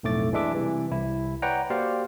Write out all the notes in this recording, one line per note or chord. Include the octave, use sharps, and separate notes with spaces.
B1 F2 A2 A3 D6 A6
E3 G#3 D4 E5 D6
C3 E3 G3
C2 E4
B4 C#5 D5 F#5 G5 A#5
A#3 F#4 G4 C5 D5 F5